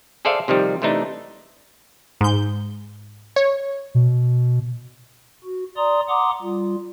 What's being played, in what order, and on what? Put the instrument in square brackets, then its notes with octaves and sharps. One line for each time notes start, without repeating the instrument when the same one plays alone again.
[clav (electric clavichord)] G#4 A4 C5 D5 E5 F5
C3 D#3 F3 G3
C3 E3 A3 D4 D#4
[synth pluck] G#2 G6
C#5
[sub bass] B2
[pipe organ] F#4
D5 A#5 C6 D#6
F#5 A#5 C6 D6 D#6
G3 F4